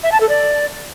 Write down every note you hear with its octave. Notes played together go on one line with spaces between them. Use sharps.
E5
A5
A4
D5